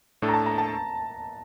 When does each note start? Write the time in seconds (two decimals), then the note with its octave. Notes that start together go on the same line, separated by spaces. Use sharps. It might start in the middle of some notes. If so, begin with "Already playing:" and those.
0.22 A2 A3 D4 A4
0.28 A#5
0.34 A5
0.46 A#5
0.58 A5